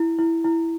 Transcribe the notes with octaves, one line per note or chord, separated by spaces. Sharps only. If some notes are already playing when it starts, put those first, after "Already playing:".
Already playing: E4
E4
E4